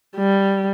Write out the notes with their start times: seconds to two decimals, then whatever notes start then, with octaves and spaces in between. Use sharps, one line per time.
0.16 G3